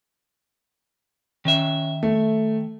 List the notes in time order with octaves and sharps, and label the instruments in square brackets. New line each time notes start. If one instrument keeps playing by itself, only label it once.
[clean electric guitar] D#3 E5 [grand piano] C#4
[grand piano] A3